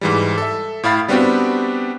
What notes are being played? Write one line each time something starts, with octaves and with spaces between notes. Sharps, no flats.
G#2 E3 G3
A4 E5
A2 E4 F5 B5 A6
G3 B3 C4 D4 F#4 G4